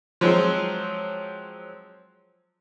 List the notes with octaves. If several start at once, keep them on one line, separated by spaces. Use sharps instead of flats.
F3 F#3 G#3 C4